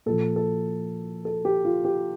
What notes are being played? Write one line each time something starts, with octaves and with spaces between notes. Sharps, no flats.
A#2 F3 A4
A4
A4
G4
F4
G4